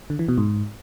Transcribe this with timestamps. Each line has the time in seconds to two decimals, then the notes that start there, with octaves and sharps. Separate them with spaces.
0.10 D3
0.19 E3
0.28 B2
0.38 G#2